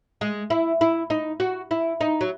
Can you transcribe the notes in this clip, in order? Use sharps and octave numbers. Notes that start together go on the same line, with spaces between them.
G#3
E4
E4
D#4
F#4
E4
D#4
F#3